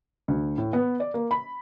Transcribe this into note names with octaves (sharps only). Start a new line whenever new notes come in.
D2
A2
B3
D5
A#3
B5